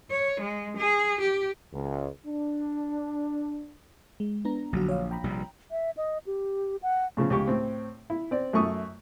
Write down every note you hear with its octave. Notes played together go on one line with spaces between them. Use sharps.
C#5
G#3
G#4
G4
C#2
D4
G#3
B3 D4 A#5
A#1 D3 F#3 F#4
C#5 F5
G5 A#5 B5
A#1 C3 G3
E5
D#5
G4
F#5
A2 C#3 F3
C#2 G4 C#6
A2 C4
E4
C4 D5
F#2 A3 C#6 D#6